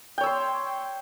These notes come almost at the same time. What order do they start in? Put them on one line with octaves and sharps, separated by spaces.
G5 C#5 E6 C6